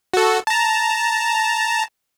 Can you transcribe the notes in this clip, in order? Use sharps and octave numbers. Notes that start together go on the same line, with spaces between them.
F#4 A4
A5 A#5